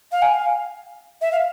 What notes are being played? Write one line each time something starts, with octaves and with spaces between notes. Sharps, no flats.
F5
G#5
F5
E5
F5